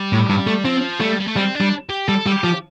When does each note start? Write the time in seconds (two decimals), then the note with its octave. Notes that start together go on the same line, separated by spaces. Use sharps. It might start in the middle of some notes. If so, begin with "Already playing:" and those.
Already playing: G3
0.12 A2
0.29 G2
0.47 A3
0.65 F3 C4
1.00 G3 A3
1.20 G3
1.28 A3
1.36 G3 C4
1.55 D4
1.61 G3
1.89 G4
2.08 G3 A4
2.26 G3
2.32 G4
2.44 F3